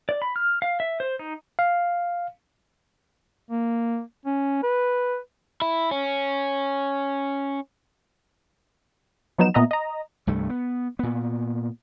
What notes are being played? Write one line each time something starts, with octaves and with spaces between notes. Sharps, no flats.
D5
B5
F6
F5
E5
C5
D#4
F5
A#3
C#4
B4
E4
C#4
F3 F#3 B3 D#4 E7
A#2 B3 D#5 E5 A#5
D#5 A#5
C2 G2 A3
B3
A#2 B3